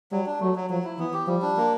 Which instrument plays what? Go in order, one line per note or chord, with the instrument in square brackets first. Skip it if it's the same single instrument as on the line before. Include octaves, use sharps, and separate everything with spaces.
[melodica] F#3 [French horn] G3
[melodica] D4
[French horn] F#3 [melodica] A3
[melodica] F#3
[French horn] F3 [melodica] F#3
[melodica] E4
[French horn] E3 [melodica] B3
[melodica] G4
[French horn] F3 [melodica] G3
[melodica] D4
A#3